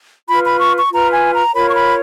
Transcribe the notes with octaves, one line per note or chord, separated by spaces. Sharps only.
F4 B4 B5
B5
C#6
C#6
F4 B4 A#5
G#5
A#5
F4 A#4 C#5 B5
C#6
B5